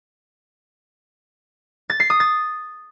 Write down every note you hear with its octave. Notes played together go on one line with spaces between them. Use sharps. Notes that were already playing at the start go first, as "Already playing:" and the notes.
A6
C7
D#6
A6